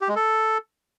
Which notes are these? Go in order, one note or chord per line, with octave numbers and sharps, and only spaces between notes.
G4
G#3
A4